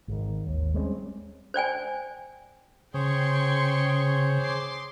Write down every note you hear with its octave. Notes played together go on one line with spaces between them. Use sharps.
G#1 D#3
D#2
G3 G#3 C4 C#4
C5 D5 G5 G#5
C#3 G#4 C5 C#5 G5 C6 C#6
C6 D6 C7